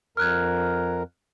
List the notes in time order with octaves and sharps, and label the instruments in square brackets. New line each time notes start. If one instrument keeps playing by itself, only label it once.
[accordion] F2 A#4 [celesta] F6 F#6 G#6